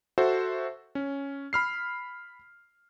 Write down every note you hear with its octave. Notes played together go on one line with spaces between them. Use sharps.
F#4 A4 C5 E5
C#4
B5 F6 C7